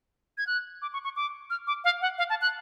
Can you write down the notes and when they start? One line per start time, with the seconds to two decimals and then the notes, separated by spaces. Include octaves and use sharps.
0.38 G#6
0.47 F#6
0.82 D6
0.93 C#6
1.04 C#6
1.16 D6
1.50 F6
1.67 D6
1.84 F5
2.02 F#5
2.18 F5
2.30 A5
2.41 F#6